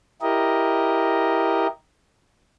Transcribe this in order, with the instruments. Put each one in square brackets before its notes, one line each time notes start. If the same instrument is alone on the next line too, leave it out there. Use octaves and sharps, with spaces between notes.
[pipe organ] E4 G4 A#4 D#5